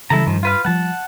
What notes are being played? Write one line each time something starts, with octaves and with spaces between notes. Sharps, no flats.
C#3 E3 G3 E4 A4 A#5
G2 D#3 F3
F4 B4 F5
F3 G3 F#5 A5